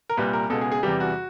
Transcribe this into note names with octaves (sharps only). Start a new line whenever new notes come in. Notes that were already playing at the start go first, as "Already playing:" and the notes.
A#4
C2 A#2 G3 B4
A#4
C#2 B2 G#3 A4
G#4
G#4
E2 C3 E3 G3 G4
F#4